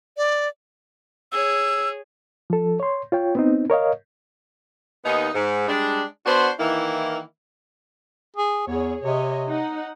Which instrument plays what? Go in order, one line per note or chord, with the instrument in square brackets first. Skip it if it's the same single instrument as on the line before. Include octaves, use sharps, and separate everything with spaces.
[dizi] D5
[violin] G#4 C#5 [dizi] E6
[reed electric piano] F3 A4
C#5 C6
F4 C#5 G5
B3 C4 D#4
A#4 C#5 D#5 F5
[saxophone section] D#2 B3 D#4
G#2
G3 G#3 D4
B3 D4 F#4 C5
D#3 E3 A#3 E4
[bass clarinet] G#4
[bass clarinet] E2 [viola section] G#4 C#5
[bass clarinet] C3 [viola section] C#5 D#5
[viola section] D#4 F#5